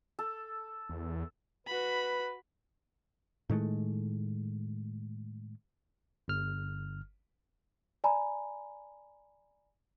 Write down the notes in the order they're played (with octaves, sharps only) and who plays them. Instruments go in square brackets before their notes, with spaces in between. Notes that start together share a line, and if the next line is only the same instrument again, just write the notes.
[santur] A4
[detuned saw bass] E2
[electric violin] F#4 B5 [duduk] B4
[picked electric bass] A2 D#3 G#3 A3
[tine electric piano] G1 F6
[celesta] D5 G#5 A#5 B5